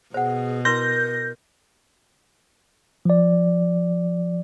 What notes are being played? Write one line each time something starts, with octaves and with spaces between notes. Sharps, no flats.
B2 G#4 C5 F#5
E4 A#4 B4 C6 G6 A#6
F3 D5